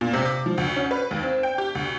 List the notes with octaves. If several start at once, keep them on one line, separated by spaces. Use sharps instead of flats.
A#2
C3
D6
F3
D2
C#4
B4
D#2
C4
G5
G4
D2